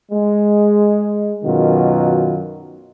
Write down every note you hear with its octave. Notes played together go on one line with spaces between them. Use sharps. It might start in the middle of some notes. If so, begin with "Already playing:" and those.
G#3
F#2 B2 D#3 F4 F#4